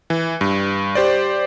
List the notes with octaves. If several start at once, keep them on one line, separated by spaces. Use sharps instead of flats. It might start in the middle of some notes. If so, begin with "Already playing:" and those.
E3
G2
G4 C5 D5